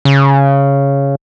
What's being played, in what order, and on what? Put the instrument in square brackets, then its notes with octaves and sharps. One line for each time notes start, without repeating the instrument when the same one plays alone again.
[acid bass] C#3